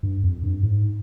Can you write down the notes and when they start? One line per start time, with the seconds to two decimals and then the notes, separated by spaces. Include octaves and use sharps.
0.03 G2
0.23 F2
0.43 G2
0.63 G#2